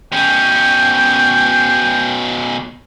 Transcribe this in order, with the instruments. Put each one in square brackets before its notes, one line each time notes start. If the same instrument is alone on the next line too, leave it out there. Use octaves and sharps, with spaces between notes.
[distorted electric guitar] B2 C#4 [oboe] G5